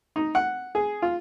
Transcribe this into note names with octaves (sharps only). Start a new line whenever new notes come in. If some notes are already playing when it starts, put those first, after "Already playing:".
D#4
F#5
G#4
F4